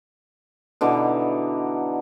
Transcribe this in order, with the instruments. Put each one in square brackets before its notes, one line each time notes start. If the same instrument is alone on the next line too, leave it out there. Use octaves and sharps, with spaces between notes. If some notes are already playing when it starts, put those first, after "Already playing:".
[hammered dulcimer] B2 D3 E3 D#4